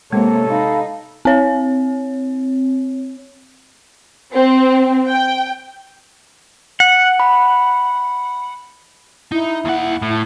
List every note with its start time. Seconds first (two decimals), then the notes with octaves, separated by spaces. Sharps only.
0.13 C3 G#3 A#3 A4 C#5
0.49 D#4 F5 B5
1.25 C4 C#5
4.33 C4
5.09 G5
6.80 F#5
7.20 B5
9.32 D#4 E4
9.65 D#2 F#5
10.02 A2